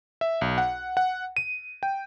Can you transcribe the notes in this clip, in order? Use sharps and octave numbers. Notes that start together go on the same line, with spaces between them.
E5
B1
F#5
F#5
D#7
G5